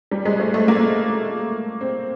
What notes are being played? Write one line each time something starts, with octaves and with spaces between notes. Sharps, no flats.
G3
G#3
A3
A3
A#3
C4